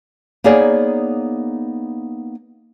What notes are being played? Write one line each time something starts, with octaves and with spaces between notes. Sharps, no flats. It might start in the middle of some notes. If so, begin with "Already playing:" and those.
A#3 B3 D#4 G#4 C#5 D5